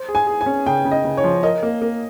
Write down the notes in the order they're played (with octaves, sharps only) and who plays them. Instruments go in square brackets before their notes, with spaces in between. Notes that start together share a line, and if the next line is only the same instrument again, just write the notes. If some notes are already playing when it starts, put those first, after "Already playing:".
Already playing: [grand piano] C5
G#4
[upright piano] G#5
[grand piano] G#4
[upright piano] G#5
[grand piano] C#4
[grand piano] C#3 [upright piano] G5
[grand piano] C#3
[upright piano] D#5
[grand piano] C#3
[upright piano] C#5
[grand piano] F3
[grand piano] A#4 [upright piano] D#5
[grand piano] A#3
A#3